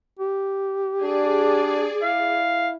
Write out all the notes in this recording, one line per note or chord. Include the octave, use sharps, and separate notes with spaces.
G4
D4 G#4 D5
E4 F5